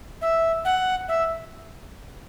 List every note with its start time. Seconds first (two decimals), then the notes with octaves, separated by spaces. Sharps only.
0.22 E5
0.65 F#5
1.08 E5